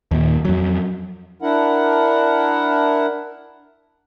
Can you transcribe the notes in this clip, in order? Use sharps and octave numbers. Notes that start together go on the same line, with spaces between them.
D#2 A#2
F2 F#3
D4 E4 A#4 F#5